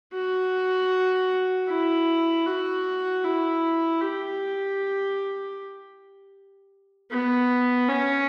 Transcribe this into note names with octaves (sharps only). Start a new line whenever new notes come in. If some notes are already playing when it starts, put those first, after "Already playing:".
F#4
E4
F#4
E4
G4
B3
C#4